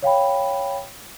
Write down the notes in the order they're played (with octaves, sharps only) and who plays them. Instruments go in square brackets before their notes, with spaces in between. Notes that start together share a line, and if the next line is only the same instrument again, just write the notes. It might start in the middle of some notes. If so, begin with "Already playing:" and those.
[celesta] C#5 F5 G5 B5